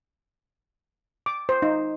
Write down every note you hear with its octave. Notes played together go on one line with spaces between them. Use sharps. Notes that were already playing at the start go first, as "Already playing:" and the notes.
D6
C5
D#4